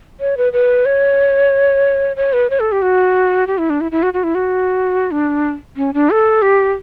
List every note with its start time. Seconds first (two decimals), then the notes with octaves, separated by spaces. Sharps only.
0.20 C#5
0.37 B4
0.53 B4
0.86 C#5
2.16 C#5
2.33 B4
2.50 C#5
2.60 A4
2.72 G4
2.82 F#4
3.47 G4
3.58 E4
3.70 D4
3.81 E4
3.92 E4
4.03 F#4
4.14 F#4
4.24 E4
4.35 F#4
5.11 D4
5.77 C#4
5.94 D4
6.10 A4
6.42 G4